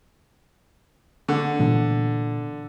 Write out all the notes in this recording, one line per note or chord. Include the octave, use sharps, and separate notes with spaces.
D3
A#2 E3 B3